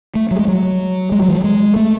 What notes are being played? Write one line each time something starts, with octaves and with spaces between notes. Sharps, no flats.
A3
F#3
G#3
F#3
G#3
F#3
E3
F#3
G#3
A3